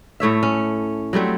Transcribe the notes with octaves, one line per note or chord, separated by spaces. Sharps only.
A2 A3 C#5 E5
C#4
F#3 G3 A3 C4